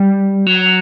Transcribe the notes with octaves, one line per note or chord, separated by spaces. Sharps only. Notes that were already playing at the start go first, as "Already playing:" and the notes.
Already playing: G3
F#3